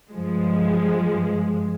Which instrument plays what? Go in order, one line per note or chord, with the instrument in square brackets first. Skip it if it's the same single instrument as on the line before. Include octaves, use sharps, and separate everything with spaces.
[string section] G2 F3 G#3